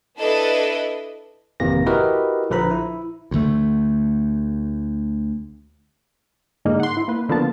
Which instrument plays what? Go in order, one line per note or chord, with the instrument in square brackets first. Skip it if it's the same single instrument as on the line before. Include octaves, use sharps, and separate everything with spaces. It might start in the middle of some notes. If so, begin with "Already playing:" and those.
[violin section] D4 E4 A4 B4 D#5
[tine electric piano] G#1 F2 C3 E3 A#3 A#6
E4 F#4 G4 A#4 B4 D#5
A#1 D3 F3 B4 A#5 B5
E4
[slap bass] D2 D3 A3
[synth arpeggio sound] G#2 D3 G#3 A#3 D#4
F#5 C6
E4
A#3 B4
D3 F3 A#3 B3 F4 A5